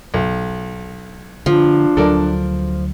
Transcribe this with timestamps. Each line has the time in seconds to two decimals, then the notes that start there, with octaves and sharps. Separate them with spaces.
0.14 B1
1.46 D3 F3 D4
1.97 D2 F#3 A4 A#4 D5